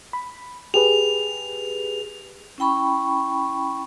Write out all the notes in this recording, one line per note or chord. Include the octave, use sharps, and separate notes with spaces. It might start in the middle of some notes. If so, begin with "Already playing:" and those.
B5
G4 G#4 B4 F7
C#4 E4 G5 B5 C#6